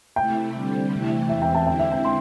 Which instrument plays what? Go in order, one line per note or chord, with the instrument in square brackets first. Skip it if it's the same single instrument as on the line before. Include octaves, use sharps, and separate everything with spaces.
[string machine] C3 A3 E4 [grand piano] G5
[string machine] D3 G3 C4
C3 E3 A3 E4
[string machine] E2 E3 C4 [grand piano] E5
[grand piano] G5
E5 A5
[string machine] D3 C4 E4 [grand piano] G5
[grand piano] E5
G5
G5 C6